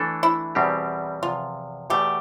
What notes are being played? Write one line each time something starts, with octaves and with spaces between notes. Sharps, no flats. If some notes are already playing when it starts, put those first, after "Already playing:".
Already playing: E3 A3 D4 A4
E4
E2 B2 G3 C4 G4
E2 C3 F3 F4
E2 B2 A3 G4